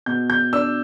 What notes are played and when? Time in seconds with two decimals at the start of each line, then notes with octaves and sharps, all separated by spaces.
0.06 B2 G6
0.30 G6
0.53 D4 E6